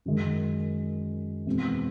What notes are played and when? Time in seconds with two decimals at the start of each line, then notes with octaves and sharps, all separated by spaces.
0.06 F#2 D#3 G#3
1.46 E2 B2 G#3 C4